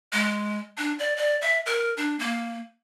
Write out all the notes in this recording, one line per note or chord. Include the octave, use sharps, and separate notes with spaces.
G#3
D4
D5
D5
E5
A#4
D4
A#3